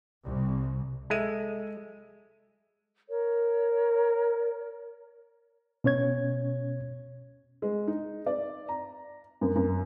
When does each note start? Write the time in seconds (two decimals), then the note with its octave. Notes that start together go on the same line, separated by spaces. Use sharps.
0.23 C2
1.10 G#3 A4 E5 D#7
3.08 A#4 C#5
5.84 B2 C#4 C#5 G#6
7.62 G#3
7.87 D#4
8.26 D5
8.69 A#5
9.41 F#2
9.56 F#2